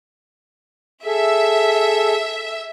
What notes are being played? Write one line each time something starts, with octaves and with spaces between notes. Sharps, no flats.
G#4 A4 E5